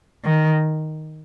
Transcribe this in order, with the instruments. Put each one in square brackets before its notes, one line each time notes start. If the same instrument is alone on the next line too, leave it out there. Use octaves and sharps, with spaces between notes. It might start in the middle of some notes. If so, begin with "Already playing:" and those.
[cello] D#3